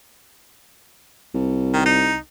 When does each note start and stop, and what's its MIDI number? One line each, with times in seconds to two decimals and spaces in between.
1.34 2.18 36
1.73 1.81 51
1.85 2.16 63